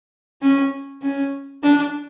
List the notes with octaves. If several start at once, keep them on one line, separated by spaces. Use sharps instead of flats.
C#4
C#4
D4